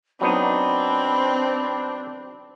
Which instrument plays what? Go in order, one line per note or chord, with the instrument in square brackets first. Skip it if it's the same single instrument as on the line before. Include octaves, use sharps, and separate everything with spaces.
[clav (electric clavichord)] F#3 B3 D#4 [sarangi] C4 [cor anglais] D4 [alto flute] B5